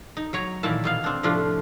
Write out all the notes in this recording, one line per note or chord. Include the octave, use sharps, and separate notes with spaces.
D#4
F#3 C#5 A#5
A#2 D#3 E3 A#3 E4 A5
B2 B3 F5
C4 D4
A2 C3 F3 A3 D4 F4